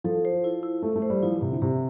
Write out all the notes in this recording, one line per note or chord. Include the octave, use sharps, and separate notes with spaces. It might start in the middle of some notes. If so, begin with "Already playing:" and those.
F3 A4
C5
E4
E4
A3 A4
A3
C5
G3
F3 E4
E3
C3 E4
D3
C3 G4